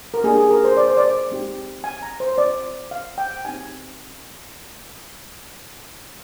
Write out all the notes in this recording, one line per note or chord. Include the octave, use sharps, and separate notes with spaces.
A#4
A#3 D4 G4 G#4
G#4
A#4
C5
D5
C5
D5
G#3 C4 D#4 G4
G#5
A#5
C5
C4 F4 D5
F5
G5
C4 D#4 G4 G#5